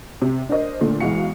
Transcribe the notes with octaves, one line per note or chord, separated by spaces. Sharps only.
C3
D4 A#4 C5 D#5
A#2 D3 A3
B1 E3 G#3 F#4 F5 C#7